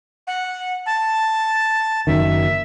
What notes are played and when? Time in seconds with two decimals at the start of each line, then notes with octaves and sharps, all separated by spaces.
0.27 F#5
0.86 A5
2.07 F#1 F#2 D#3 E5